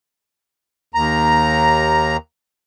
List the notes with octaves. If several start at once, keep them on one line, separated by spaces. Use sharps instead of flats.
D#2 A#5